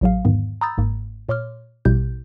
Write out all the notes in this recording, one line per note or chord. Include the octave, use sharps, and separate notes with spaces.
A1 A2 F#3 G#4 F5
E2 G#2 D3 D#3 B3
A#5 B5 D#6 E6 G6 A6
G1 G#2 A#3
A#2 C#5 C6 D6 F6
A#1 B2 G3 E4 G4 G6